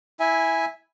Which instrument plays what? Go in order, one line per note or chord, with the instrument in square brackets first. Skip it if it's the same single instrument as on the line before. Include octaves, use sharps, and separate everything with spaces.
[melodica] E4 E5 G#5